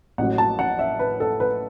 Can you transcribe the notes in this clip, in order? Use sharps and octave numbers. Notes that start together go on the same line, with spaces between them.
A1 A2 F#3 F#5
A5
F#5
E5
B4
A4
B4